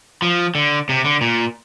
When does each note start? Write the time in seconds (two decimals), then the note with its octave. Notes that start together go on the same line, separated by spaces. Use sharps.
0.22 F3
0.55 D3
0.89 C3
1.04 D3
1.21 A#2